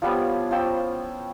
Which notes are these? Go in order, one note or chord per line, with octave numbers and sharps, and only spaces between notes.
F3 G3 B3 C#5
F3 C#4 G5 E6